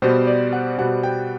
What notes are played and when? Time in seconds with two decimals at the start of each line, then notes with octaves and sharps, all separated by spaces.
0.02 B2 G3 B3 C5
0.27 D5
0.53 F#5
0.78 B2 G3 B3 F#5
1.03 G5